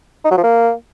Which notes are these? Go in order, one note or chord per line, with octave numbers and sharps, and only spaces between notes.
D#4
F#3
F3
A#3